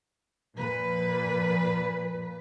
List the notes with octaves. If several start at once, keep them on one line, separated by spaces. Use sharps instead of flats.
A#2 F3 B4